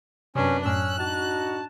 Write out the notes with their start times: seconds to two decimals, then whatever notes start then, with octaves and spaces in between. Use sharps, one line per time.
0.35 F#2 C3 C#4 D4 B4
0.65 F#2 A2 C#4 E6 F#6
0.99 D4 D#4 F#4 A5